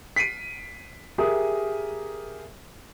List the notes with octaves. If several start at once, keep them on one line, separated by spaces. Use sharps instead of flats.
B6 C7 D7 D#7
G4 G#4 A#4 E5 D#6